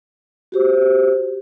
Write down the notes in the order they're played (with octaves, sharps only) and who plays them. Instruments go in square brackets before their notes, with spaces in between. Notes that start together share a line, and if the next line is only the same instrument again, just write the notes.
[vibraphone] F#4 G4 C5